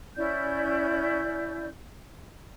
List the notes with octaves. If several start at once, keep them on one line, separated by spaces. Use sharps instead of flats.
C#4 E4 D5 G6